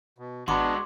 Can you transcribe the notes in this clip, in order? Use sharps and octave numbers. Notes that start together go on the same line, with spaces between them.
B2
G#1 G#3 B3 D4 F#4 B5 C6 D6